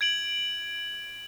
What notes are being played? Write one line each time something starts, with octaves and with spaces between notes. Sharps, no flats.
G#6 D7 F#7